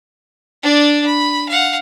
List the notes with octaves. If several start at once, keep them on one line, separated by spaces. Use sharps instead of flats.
D4 D5
B5
F5 F#5